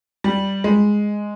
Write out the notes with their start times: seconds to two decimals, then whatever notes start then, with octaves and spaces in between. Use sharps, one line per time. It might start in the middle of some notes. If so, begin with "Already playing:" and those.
0.24 G3
0.64 G#3